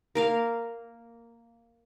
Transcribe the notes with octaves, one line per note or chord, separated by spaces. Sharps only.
A#3 A#4 F5